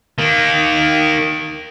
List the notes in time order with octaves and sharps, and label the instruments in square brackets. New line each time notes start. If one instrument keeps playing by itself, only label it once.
[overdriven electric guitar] D#3 A#3